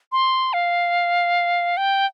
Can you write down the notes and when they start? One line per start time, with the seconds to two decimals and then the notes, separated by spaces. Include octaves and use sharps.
0.12 C6
0.53 F5
1.77 G5